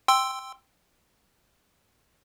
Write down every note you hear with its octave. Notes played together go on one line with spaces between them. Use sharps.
G5 C6 E6